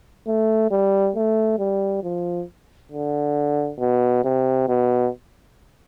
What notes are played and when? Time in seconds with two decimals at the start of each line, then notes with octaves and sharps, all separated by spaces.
0.27 A3
0.71 G3
1.16 A3
1.59 G3
2.03 F3
2.92 D3
3.80 B2
4.24 C3
4.68 B2